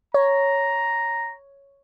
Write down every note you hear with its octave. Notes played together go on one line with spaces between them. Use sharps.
C#5 A#5